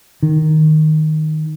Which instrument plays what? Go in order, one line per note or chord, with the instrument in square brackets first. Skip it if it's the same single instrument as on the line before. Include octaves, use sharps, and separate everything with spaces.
[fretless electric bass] D#3